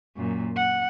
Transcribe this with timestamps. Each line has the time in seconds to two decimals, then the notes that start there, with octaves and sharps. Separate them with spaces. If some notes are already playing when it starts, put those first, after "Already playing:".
0.17 F#2 A#2
0.57 F#5